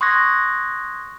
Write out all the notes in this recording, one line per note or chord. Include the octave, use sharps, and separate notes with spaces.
C6 C#6 D#6 F#6 G#6 A#6